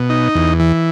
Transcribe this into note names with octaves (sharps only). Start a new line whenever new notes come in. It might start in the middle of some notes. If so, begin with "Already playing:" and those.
Already playing: B2
D#4
E2
E3